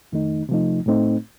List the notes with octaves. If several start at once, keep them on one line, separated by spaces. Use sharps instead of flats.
F2 D#3 A3 D#4
C3 F3 A3 D#4
A2 A3 C4 D#4